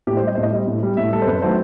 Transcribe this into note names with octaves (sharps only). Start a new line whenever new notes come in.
A2 G4
G3 C5
D#5
A2 C5
D#5
G3
A2
G3
A2 E5
G3 A4
C5
F#2 B4
D#3 F#3 A3 C5